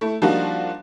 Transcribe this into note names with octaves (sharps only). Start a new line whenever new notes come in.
A3 E4
F3 G3 A#3 D4 D#4 F#4